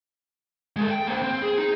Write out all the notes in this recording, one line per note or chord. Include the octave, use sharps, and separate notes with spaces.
G#3 A4
G5
A#3 C5
C4
G#4
D#4